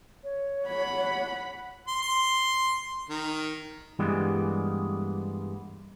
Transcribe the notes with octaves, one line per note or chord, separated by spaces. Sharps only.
C#5
F#5 B5
C6
C6
D#3
G2 E3 G3 G#3 A#3 B3